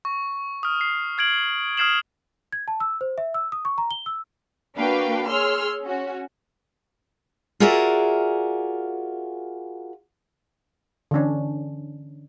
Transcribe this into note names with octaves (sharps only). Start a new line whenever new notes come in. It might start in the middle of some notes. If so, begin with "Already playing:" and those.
C#6
D#6 F6
C7
F6 G#6 D7 F#7
D#6 F6 G#6 C7 E7 F#7
G#6
A5
E6
C5
E5
E6
D#6
C#6
A#5
G7
E6
A#3 D4 F#4 B4 F5 G5
G#4 C#5 C6 E6 F6
C#4 F#4
F4 F#4 G#4 A#4 D5 E5
D3 E3 C#4 D4